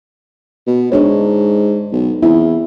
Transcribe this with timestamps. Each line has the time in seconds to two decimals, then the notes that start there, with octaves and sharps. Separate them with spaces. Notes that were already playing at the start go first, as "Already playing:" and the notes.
0.67 B2
0.92 G#2 D4 D#4 C#5
1.92 B1
2.23 E2 C4 E4